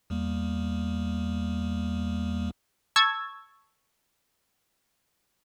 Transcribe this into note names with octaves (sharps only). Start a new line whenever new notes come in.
E2 G3 A#3
A5 C#6 E6 G#6